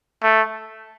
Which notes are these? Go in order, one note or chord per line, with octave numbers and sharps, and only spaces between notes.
A3